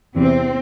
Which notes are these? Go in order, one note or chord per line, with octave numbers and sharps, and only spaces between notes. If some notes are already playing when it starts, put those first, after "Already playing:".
E2 C3 E3 C4